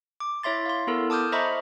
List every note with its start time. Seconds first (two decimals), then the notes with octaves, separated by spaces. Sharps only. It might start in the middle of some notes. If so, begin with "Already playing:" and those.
0.20 D6
0.43 E4 C#5 E5 C6 A6
0.66 F5 C6
0.87 B3 E4 A4 A#4
1.10 A5 D6 D#6 F6 G6
1.32 C5 D#5 E5 A#5 B5 C#6